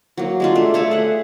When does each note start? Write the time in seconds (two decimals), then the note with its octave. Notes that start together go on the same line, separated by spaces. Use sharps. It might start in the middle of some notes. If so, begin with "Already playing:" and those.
0.17 F#3 A#3
0.40 G#3 D4 F4
0.55 A3
0.74 A3 C#5 E5 A5
0.91 G#4 F#5